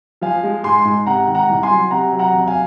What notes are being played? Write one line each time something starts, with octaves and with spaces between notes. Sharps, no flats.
F3 F5 G#5
G#3
G#2 G#5 C6
G#2
C3 F#5 A#5
D#3
F#5 A#5
C2
G#5 C6
F#3
C3 F#5 A#5
F#3
F#5 A#5
F2
F5 G#5